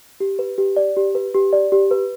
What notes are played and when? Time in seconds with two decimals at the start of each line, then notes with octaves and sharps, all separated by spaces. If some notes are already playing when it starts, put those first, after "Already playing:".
0.20 G4
0.39 B4
0.58 G4
0.77 D5
0.97 G4
1.15 B4
1.34 G4
1.53 D5
1.72 G4
1.91 B4